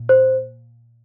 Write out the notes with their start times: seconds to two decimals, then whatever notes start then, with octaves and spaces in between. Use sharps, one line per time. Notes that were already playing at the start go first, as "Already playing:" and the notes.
Already playing: A#2
0.09 C5